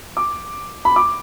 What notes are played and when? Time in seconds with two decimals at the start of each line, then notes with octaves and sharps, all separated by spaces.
0.17 D6
0.85 B5
0.96 D6